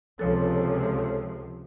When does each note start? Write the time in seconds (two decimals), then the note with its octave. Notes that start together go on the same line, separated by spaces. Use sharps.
0.19 C#2 C3 F3 A4 C#5